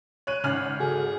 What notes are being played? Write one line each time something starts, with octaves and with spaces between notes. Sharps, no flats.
C#5 F#6 D#7
G#1 C#3 F6 F#7
F#4 G#4 A4